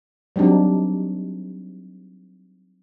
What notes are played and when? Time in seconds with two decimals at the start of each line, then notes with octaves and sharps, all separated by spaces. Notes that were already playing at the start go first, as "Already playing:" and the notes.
0.36 F#3 G3 C4 D4 D#4